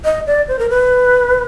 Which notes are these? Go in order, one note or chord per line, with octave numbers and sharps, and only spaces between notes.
D#5
D5
C5
A#4
B4